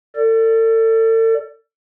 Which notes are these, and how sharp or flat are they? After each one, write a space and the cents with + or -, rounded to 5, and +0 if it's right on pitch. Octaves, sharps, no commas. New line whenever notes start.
A4 +40 D5 +0